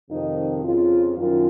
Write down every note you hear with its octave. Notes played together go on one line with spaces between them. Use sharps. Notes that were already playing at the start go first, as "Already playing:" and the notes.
F2 C3 D#3 D#4
F2 C#3 F4
F#2 D#3 F4